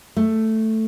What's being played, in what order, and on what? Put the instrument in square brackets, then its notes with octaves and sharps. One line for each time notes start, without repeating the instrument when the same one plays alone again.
[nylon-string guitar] A3